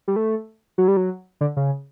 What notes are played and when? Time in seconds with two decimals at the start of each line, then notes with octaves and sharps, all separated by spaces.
0.08 G3
0.16 A3
0.78 F#3
0.88 G3
0.97 F#3
1.41 D3
1.57 C#3